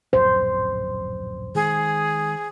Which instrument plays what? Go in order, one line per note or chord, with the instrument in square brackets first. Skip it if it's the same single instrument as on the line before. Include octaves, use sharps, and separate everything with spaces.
[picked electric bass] D1 A#1 F#2 [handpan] C5
[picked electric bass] D#3 G#3 [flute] G#4